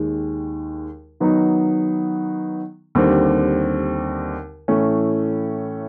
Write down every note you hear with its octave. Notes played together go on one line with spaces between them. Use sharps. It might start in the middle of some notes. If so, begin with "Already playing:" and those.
Already playing: D#2 D#3 G#3
D#3 F#3 B3 D#4
D#2 D3 G3 C4
A2 E3 A3 C#4